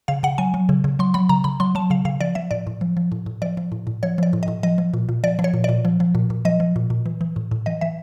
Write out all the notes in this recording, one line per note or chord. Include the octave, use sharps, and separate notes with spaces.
C#3 F5
C#3 F#5
F#3 G#5
F#3
C#3
C#3
F#3 C6
F#3 B5
C#3 A#5
C#3 B5
F#3 C6
F#3 A5
C#3 F5
C#3 F5
F3 D5
F3 E5
A2 D5
A2
F3
F3
A2
A2
F3 D5
F3
A2
A2
F3 C#5
F3 D5
A2
D#5
A2
F3 D#5
F3
A#2
A#2
F3 D5
F3
C#5
A#2
A#2 D5
F3
F3
A#2
A#2
F3 D#5
F3
A#2
A#2
E3
E3
A2
A2
E3 D#5
E3 E5